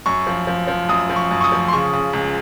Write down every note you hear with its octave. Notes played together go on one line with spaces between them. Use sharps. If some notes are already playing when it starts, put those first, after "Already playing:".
F#2 C#6
F3
F3
F3
F#2 D#6
F3
C#6
F#2
C#6
D#6
F3
C6
C#3 C#6
C#3
C#2